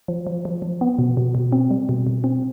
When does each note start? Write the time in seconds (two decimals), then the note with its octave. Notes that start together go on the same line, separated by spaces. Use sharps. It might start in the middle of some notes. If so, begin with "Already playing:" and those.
0.08 F3
0.27 F3
0.45 F3
0.62 F3
0.81 B3
0.99 B2
1.17 B2
1.35 B2
1.52 C4
1.71 G3
1.89 B2
2.07 B2
2.24 C4